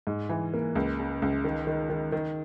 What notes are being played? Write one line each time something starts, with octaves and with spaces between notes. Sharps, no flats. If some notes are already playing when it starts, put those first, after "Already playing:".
G#2
E3
A#3
C#2
C#3
C#2
D#3
D#3
D#3
D#3